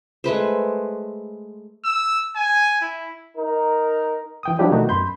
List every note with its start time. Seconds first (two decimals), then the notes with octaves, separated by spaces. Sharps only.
0.24 G#3 A3 B4 C5
1.84 E6
2.36 G#5
2.81 E4
3.37 D#4 A#4
4.43 E3 G5 D#6
4.59 F3 F#3 D4 E4 G4 D5
4.72 B2 D#3 A3 B3 D#4 F#4
4.89 F#2 B5 C6 G6